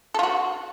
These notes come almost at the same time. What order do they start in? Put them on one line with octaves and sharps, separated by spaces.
A4 F4 F#4